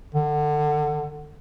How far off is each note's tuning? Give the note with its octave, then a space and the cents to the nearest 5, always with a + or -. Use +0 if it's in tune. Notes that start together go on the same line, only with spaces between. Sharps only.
D3 +25